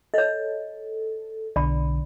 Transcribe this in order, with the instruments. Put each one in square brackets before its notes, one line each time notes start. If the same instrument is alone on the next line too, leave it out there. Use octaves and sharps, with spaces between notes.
[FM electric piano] A4 [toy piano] C#5 D#5
[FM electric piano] B1 D3 [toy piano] D5 B5